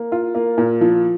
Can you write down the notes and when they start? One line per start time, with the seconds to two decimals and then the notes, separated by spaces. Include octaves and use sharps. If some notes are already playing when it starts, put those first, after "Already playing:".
Already playing: A#3
0.12 F4
0.35 A#3
0.58 A#2
0.81 F3